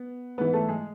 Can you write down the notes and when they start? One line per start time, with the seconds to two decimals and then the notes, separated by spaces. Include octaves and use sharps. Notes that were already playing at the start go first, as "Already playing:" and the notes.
Already playing: B3
0.38 G#2 E3 B3 B4
0.53 A3 A4
0.68 G#3 G#4